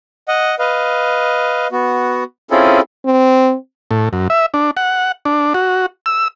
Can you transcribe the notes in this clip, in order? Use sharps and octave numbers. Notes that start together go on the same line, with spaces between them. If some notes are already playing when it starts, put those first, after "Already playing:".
D#5 F#5
B4 D#5 F5
B3 F#4
C4 C#4 E4 F4 G#4 A4
C4
A2
F#2
E5
D4
F#5
D4
F#4
E6